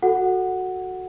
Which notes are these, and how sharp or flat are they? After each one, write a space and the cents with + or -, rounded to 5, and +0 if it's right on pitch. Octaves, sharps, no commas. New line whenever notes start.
F#4 +0 A4 +0 F#5 +0